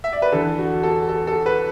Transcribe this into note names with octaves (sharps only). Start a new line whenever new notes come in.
E5
D5
B4
E2 D3 A4
F#4
A4
A4
A4
B4